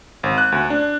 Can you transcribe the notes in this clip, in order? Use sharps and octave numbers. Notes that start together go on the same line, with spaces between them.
G#1
F#6
D2
D4